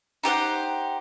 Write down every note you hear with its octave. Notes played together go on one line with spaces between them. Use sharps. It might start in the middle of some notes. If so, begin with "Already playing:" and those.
D#4 G4 C5 F#5